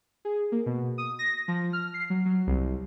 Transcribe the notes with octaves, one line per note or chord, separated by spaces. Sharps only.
G#4
A#3
B2
D#6
A#6
F3
F6
C7
F#3
F#3
C2